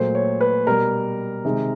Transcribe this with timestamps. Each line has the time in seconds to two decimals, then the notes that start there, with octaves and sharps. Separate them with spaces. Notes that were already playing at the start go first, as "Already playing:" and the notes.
Already playing: A#2 F#3 A3 C5
0.15 C#5
0.41 B4
0.67 B2 G3 A#4
1.45 C3 D#3 G#3